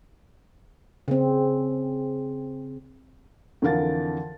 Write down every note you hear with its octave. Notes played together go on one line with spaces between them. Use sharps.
C#3 C4
F2 D3 E3 A#4 F5 A6